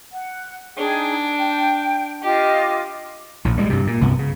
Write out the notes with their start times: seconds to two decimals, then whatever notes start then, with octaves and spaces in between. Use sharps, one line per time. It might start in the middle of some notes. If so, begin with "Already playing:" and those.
0.12 F#5
0.78 D4 D#4 G#4 G5
1.38 G5
2.22 F4 G4 D#5 D6
3.45 A#1 A2
3.56 D2 G3 G#3
3.70 G2 C3
3.87 A#2
4.01 C2 G2 C3 B3
4.19 C#3